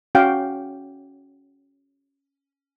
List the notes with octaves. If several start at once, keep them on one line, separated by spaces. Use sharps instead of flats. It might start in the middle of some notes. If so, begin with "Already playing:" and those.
C#4 F#4 F5 G5